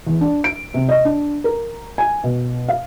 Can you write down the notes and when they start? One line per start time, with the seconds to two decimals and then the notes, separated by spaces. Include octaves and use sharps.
0.06 E2
0.21 D4
0.44 D7
0.74 C3
0.89 D#5
1.05 D4
1.44 A#4
1.98 G#5
2.24 B2
2.68 F5